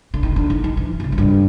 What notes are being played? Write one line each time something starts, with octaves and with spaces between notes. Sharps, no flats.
D3
D#3
D3
D#3
D#3
E3
C3
C#3
F#2
G2